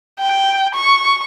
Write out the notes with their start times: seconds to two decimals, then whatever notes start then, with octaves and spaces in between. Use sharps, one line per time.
0.19 G5
0.74 C#6